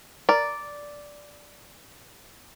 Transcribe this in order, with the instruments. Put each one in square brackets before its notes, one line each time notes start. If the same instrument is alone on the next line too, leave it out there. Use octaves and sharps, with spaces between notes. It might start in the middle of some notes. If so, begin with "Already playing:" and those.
[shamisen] A#4 [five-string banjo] D5